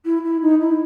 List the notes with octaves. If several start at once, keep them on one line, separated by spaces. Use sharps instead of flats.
E4
E4
D#4
E4